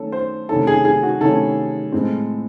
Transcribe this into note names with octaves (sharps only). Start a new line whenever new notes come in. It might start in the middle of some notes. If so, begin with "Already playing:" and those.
Already playing: D#3 A3 C#4 A4
C5
C3 D#3 A3 C#4 E4 A4
G#4
G#4
F#4
C3 D#3 A3 C#4 E4 A4
A2 G#3 C4